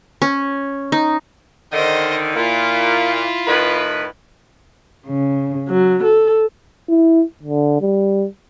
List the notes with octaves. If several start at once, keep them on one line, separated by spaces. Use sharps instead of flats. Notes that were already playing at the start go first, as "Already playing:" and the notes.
C#4
D#4
D3 D#3 C5 D#5
A#2 A#3 E4 F4
A2 D#3 B4
C#3
F#3
A4
E4
D3
G3